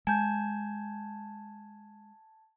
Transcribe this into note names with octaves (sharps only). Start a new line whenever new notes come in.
G#3 G#5 A5 G6 G#6